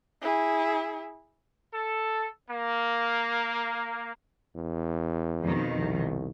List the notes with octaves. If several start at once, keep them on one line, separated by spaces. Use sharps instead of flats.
E4 G#4
A4
A#3
E2
F2 B2 D#3
C2